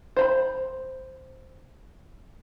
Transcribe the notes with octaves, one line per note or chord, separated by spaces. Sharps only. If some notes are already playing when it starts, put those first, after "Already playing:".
C5 A#5 B5